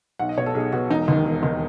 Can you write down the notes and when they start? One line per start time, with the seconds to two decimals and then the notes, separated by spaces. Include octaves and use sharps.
0.19 B1 F#5
0.29 D#5
0.37 B2 C#5
0.46 A4
0.55 B1 G#4
0.73 B2 F#4
0.90 E1 D#4
1.08 D#2 D#3
1.25 E1
1.42 D#2 D#3